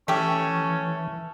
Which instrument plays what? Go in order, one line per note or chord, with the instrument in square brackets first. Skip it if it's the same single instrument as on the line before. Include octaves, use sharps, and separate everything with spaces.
[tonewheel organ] E3 [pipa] A3 G4 [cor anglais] C#4